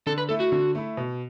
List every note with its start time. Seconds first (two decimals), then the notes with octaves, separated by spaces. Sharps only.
0.06 D3 A4
0.18 B4
0.29 A3 E4 A4
0.40 F#4
0.52 D3
0.75 A3 E4
0.97 B2